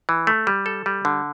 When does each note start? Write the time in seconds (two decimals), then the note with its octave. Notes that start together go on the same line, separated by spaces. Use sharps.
0.09 E3
0.27 A3
0.47 G3
0.66 A4
0.86 G3
1.05 D3